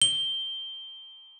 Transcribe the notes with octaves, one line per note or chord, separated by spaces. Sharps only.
G7